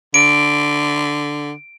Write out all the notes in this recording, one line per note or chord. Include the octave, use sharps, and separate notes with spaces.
D3 D7